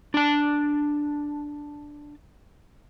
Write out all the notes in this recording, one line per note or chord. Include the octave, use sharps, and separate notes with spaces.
D4 A5